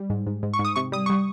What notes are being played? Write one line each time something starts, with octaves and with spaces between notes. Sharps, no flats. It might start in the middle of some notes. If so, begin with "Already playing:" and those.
Already playing: G3
G#2
G#2
G#2
C#6
G#2
D#6
C3 C#6
G3 D#6
G3 C#6